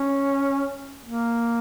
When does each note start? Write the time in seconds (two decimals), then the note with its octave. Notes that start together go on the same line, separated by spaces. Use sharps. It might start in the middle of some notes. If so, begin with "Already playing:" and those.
Already playing: C#4
1.05 A#3